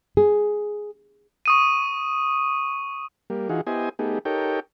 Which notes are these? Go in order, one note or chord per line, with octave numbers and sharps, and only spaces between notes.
G#4
C#6 D#6 D#7
G3 A#3
E3 D#4 F4 F#4 G#4
B3 E4 G4 C5 D#5 G#5
A3 B3 D#4 G4 G#4
D#4 G4 A4 A#4 C#5 G5